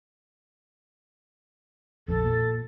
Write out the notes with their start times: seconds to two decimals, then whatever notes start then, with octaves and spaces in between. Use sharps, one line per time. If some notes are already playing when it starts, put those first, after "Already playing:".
2.08 A#1 F2 A4
2.24 A#2